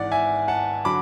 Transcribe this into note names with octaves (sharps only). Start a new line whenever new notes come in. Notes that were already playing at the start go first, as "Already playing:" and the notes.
Already playing: G#1 G#2 E3 D5 F#5
E5 G#5
F#5 A5
D3 F#3 B5 D6